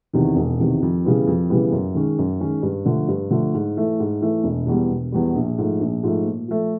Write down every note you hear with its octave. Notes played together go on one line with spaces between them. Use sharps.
E2 C3 D#3
E1
E2 C3 D#3
F2
C#3 E3 G3 B3
F2
C#3 E3 G3 B3
F#2
D#3 G#3 C#4
F#2
D#3 G#3 C#4
G2
D3 F3 A3
G2
D3 F3 A3
G#2
E3 A3
G#2
E3 A3
E1
E2 B2 G3
E1
E2 B2 G3
A#1
G#2 F3 A3
A#1
G#2 F3 A3
A#2
F3 A3